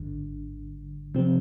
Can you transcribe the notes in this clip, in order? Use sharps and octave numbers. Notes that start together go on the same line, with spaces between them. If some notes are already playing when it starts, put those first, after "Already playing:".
Already playing: G#1 G2 D3
C3 F3 C4